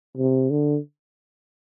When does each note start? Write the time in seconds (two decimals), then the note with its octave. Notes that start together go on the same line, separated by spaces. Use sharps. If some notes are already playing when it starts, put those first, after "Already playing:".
0.18 C3
0.50 D3